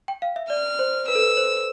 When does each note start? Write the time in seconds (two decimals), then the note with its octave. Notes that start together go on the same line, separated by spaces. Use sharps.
0.08 G5
0.22 F5
0.36 E5
0.50 D5 F6
0.79 C5
1.08 B4 E6
1.15 A4
1.22 B4
1.37 C5